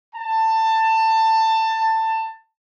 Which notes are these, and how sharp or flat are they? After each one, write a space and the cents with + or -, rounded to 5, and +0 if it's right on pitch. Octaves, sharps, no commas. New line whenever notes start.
A5 +20